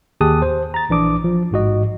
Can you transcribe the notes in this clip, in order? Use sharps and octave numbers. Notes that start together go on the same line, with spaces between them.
D#2 G4 G#4 A5 D#6 F#6
C5
A#5 A6
A#1 E3 D4 D6 D#6
F3
A1 G#2 F#4 D#5